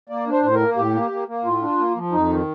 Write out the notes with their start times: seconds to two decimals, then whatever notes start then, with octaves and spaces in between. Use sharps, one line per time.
0.09 A#3 D5
0.27 D4
0.32 C5
0.43 A2 C5
0.54 A#4
0.60 A#3
0.77 A2 G4
0.94 A#3
1.11 A#3
1.28 A#3
1.45 A2 F4
1.62 D4
1.78 A#3
1.95 F3
2.12 F2 D#4
2.29 D#3